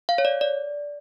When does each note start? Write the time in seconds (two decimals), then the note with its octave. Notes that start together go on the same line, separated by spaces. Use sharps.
0.09 F5
0.18 C#5
0.25 D5
0.41 D5